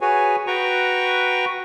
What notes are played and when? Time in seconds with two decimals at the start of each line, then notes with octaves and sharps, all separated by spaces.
0.01 F#4 G#4 B4 C#5 G#5
0.47 F#4 B4 G5 A#5 C#6